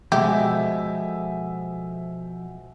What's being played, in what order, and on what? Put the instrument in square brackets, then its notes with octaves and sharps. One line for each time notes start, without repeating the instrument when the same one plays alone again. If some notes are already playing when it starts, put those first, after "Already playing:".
[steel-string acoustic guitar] B2 G#3 [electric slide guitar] F3 A4 C5 [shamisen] G4 [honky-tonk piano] E5